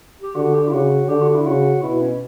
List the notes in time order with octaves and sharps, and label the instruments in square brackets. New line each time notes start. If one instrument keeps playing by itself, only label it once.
[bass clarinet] G4
[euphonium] D3 [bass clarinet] F#4
[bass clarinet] G4
E4
[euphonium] C#3 [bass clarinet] F#4
[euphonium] D3 [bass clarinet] G4
[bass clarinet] F#4
E4
[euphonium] C#3 [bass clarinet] F#4
[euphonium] B2 [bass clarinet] E4
[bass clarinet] C#4